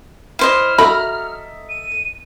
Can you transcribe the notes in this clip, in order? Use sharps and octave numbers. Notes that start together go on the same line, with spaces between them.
E4 C5 D#5 F6
F#4 A4 D#5 E5 A#5 B5
D#7